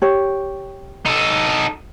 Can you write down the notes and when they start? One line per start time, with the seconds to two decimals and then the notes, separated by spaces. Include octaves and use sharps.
0.02 G4 C#5
1.06 D#4 A4